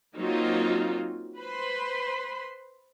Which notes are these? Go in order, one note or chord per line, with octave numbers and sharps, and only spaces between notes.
F#3 A#3 C4 D#4 F4
B4 C5 B5 C6